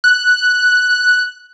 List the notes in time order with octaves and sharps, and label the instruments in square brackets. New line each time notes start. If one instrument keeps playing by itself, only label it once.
[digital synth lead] F#6